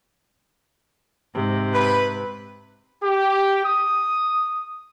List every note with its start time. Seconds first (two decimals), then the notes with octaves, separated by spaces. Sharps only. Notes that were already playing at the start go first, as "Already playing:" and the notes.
1.34 G#2 C3
1.73 B4
3.02 G4
3.64 D#6